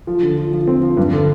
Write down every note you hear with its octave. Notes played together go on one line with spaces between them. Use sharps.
F3
D3
F3
F3
C4
F3
G2
D3